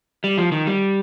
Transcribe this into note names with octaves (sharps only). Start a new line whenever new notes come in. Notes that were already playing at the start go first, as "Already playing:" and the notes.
G3
F3
D#3
G3